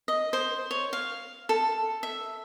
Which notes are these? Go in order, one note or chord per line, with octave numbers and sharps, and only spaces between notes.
D#5
C5
C#5
F5
A4
E5